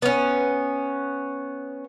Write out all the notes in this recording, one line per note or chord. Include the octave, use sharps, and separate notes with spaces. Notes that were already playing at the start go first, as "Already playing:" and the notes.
B3 C#4